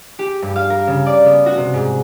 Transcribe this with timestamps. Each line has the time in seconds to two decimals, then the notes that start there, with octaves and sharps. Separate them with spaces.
0.19 G4
0.42 G2
0.56 F5
0.70 A#4
0.87 C#3
1.06 D5
1.26 B3
1.46 F#4
1.57 C3
1.74 G#2